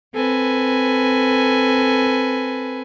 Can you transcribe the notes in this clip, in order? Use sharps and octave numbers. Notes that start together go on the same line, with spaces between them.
C4 A4 B4 G#5